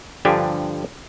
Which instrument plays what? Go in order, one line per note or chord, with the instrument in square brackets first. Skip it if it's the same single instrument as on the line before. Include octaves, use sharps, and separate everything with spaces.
[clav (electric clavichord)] G2 D3 F3 D4 G4 G#5